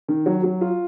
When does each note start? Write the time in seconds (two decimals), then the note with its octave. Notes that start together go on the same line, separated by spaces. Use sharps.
0.08 D#3
0.26 F#3
0.43 F#3
0.61 F4